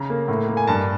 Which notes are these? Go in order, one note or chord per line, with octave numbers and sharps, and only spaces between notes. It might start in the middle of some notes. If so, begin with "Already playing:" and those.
Already playing: C#3 A#5
A#3
A2
A#3
G#5
G2 A5